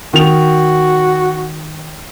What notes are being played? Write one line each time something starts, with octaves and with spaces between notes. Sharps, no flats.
D#3 F#4 F7